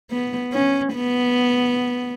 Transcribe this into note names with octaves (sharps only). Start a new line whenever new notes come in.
B3
C#4
B3